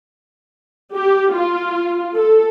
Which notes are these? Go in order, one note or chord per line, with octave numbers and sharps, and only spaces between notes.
G4
F4
A4